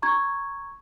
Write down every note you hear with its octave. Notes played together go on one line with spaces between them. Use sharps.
A#5 C#6 G#6